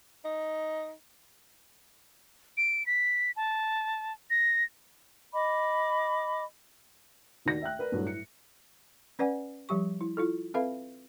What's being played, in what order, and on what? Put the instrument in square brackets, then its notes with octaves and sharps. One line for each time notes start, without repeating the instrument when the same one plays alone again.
[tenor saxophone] D#4
[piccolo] D7
B6
A5
A#6
[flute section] D#5 B5 D6
[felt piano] D#2 D#3 F#4 D5 A#6
E5 G5 F#6
A#4 B4 D5
G2 F#3 A3 E4
A2 C#7
[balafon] C#4 B4 D5 F#5 G#5
F3 G3 G4 C#6
E4
E4 F4 A4
C4 A4 B4 E5 F5 B5